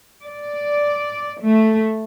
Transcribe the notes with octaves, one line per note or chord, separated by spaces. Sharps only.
D5
A3